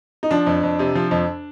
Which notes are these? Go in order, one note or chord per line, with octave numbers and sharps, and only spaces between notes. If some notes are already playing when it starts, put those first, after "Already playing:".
D#4
F3 D4
F2
F2
C3
F3
F2